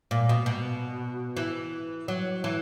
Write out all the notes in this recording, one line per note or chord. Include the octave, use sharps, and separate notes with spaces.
A#2
B2
B2
E3
F#3
E3